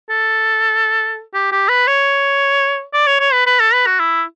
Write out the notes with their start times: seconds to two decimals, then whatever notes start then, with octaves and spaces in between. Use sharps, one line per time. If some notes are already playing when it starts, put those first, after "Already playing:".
0.10 A4
1.34 G4
1.52 G4
1.69 B4
1.87 C#5
2.93 D5
3.07 C#5
3.20 C#5
3.33 B4
3.46 B4
3.60 A4
3.73 B4
3.86 F#4
4.00 E4